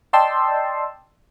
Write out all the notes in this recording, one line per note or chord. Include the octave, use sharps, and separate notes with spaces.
D5 D#5 G5 A5 C6 E6